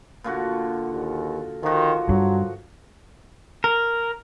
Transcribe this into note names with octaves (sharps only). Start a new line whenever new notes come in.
A#2 D3 F#4
D#2
D#3 F3 F#4
G2 F#3
A#4